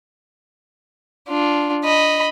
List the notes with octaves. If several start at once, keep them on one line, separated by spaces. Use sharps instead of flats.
D4 F4
D#5 B5